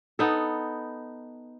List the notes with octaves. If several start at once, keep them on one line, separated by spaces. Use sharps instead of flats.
B3 D#4 A4